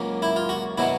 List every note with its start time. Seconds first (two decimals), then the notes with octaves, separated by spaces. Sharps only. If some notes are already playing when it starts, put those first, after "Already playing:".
Already playing: C#2 C#3 F#3 A#3
0.22 E4
0.36 F4
0.49 F#4
0.78 B2 F#3 B3 E4